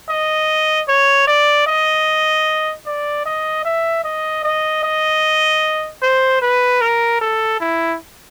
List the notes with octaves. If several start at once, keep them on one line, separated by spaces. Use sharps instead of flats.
D#5
C#5
D5
D#5
D5
D#5
E5
D#5
D#5
D#5
C5
B4
A#4
A4
E4